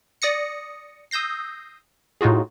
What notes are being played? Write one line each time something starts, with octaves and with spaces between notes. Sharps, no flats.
D5 D#6 A#6 C#7
D#6 E6 G6 A#6 C7
A2 D#4 F4 F#4 G#4